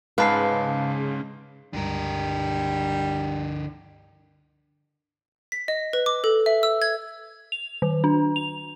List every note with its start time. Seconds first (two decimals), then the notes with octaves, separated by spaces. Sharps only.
0.18 G#2 C#3 G#3 B4 F5 A5 C7
1.73 C#2 G2 D3 G3 A#4
5.52 B6
5.68 D#5
5.93 B4
6.06 D6
6.24 A4
6.46 E5
6.63 E6
6.82 G#6
7.52 F7
7.82 D#3
8.04 D4
8.36 F7